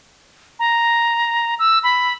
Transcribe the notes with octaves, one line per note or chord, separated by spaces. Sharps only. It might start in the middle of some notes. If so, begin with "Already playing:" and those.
A#5
E6
B5